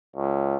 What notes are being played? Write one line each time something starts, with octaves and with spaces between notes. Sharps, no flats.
C#2